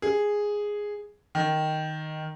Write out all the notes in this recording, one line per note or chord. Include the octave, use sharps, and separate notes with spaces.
G#4
D#3